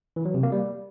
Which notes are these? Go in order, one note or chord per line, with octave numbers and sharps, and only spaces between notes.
E3
F#3
C3
A#3
G3